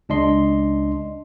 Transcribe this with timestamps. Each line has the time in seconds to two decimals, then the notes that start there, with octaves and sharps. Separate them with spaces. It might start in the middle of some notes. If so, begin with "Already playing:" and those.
0.09 C#2 D4 D#5 C6